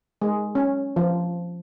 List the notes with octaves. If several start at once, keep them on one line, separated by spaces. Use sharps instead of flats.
G#3
C#4
F3